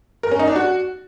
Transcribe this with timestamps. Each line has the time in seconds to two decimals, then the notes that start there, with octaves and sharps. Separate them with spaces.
0.23 A#4
0.31 C#4
0.39 D#4
0.48 D4
0.56 F#4